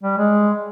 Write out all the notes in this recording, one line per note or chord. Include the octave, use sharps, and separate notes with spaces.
G3
G#3